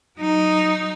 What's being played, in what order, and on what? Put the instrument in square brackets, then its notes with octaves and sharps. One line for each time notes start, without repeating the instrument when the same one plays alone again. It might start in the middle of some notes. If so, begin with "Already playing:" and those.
[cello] F#3 D#4